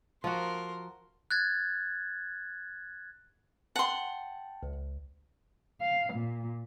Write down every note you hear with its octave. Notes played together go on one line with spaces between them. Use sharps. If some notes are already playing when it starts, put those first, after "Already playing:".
F3 F4 F#4 A#4 C6
F#6 G#6 A6
F#5 G5 A5 C6
C#2
F5
A#2